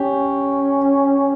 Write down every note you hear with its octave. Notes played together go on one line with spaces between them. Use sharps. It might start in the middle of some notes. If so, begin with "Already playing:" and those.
Already playing: C#4 G4